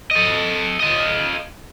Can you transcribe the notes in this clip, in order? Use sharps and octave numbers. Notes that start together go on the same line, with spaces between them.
A4 D#5
F4 D#5